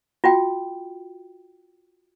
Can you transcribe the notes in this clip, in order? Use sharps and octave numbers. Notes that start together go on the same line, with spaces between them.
F4 F#4 G5